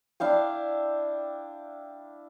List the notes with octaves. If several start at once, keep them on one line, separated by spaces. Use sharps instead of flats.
D4 E4 F5 G5